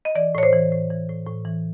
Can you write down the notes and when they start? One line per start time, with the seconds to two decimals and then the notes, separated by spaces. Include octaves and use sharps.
0.05 D#5
0.15 E3 D5
0.35 A2 C#5
0.43 C5
0.53 E3
0.72 A2
0.90 E3
1.09 A2
1.27 A2
1.45 E3